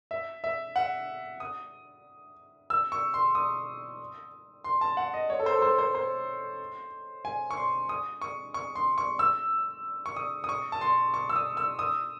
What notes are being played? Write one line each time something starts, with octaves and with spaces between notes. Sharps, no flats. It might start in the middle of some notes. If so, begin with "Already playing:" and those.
E5
E5
F#5
D#6
E6
C#6
C6
D#6
C6
A5
F#5
D#5
C#5
A4
C5
A4
C5
C5
C5
G#5
C#6
C6
D#6
C#6
C#6
C6
C#6
E6
C#6
D#6
D#6
C#6
A5
C6
C#6
E6
D#6
E6
D#6